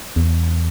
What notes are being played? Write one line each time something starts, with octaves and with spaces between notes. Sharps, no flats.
E2